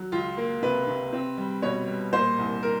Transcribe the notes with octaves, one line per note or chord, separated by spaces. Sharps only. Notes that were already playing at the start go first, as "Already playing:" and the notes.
Already playing: F#3
C#2 F4
A#3
C3 B4
C3
C4
G3
B2 C#5
G3
A#2 C5
C2
A#4